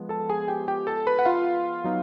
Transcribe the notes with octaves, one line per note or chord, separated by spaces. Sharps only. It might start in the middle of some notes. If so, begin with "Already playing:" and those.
Already playing: F3 G#3 B3
A4 A5
G#4 G#5
G4 G5
G4 G5
A4 A5
B4 B5
F#5
F4 F5
F#3 B3 D#4